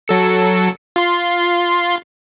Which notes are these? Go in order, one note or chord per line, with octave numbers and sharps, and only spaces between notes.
F#3 A4 C#7
F4 C6